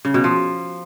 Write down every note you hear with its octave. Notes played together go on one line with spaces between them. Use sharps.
C#3
B2
F3